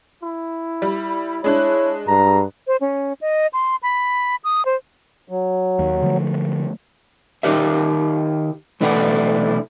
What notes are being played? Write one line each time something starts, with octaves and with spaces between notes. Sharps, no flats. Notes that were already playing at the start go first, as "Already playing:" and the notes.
E4
G3
G#3 D4 E4 C#5 F#6
G2 A#5
C5
C#4
D#5
C6
B5
D#6
C5
F#3
D#2
D3 F3 A3
D#3 D#4 G4 A#4 E5
B1 E3 A3 D4 E4 F#5